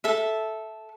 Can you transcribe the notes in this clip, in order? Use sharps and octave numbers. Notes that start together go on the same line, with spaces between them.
A4 E5